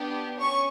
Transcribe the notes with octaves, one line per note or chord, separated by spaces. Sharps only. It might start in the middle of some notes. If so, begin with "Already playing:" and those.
Already playing: B3 D4 G4
C#4 C#6